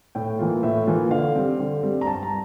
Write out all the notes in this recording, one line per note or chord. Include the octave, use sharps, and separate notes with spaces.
A2 G5
E3 A#3 F4
A2 E5
E3 A#3 F4
D3 F5
G3 C4
D3
G3 C4
A#5
G2 A5
A#5